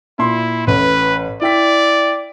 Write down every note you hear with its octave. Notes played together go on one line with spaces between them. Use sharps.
A#2 E4 C6
A1 B4
E4 D5 G5 B6